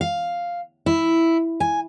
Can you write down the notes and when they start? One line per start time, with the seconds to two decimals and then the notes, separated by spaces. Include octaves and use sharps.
0.01 F5
0.86 E4
1.60 G#5